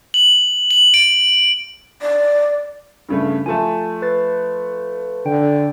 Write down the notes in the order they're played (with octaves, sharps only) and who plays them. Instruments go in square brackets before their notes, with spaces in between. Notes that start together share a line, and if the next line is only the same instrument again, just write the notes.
[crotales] F#7
F#7
D7
[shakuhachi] D5
[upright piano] G2 C#3 A3
[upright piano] F3 A3 [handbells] G#5 A5
[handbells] B4 A6
[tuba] D3 [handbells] G5